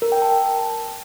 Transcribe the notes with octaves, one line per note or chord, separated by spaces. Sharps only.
A#4
G5
A5